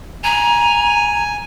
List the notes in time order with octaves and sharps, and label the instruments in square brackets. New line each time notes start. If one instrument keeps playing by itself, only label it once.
[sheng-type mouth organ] G#5 [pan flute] A#5